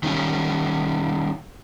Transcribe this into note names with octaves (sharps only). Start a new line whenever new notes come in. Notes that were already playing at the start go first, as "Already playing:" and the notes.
D#3 G3 C#4